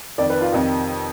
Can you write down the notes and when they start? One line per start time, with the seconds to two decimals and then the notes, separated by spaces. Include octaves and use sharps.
0.18 F2 D#3 D5
0.30 B4
0.41 F4
0.52 F2 C3 D#3 D#4